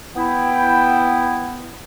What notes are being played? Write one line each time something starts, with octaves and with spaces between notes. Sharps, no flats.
B3 E4 G5